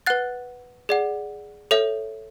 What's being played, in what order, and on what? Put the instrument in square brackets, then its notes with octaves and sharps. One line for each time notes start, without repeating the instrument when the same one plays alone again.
[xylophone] B4 F#5 F#6 A6
G#4 D5 F#5
A4 C#5 E5